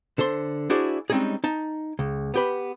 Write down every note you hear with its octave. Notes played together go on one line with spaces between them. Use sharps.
D3 A4 C5 C6
D4 E4 F#4 G#4 C5 D5
G3 G#3 C4 C#4 D#4 G#4
D#4 A5
C#2
B3 G4 B4